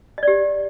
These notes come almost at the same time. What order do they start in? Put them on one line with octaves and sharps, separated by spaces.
D#5 D5 G4